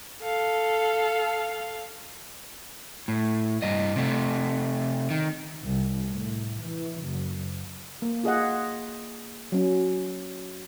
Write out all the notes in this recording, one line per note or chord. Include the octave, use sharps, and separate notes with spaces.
A4 F5
A2
G2 D#5
C3 A3
D#3
C2
A2
E3
F#1
A#3
F4 G#4 D#5 F#5
F#3 C#4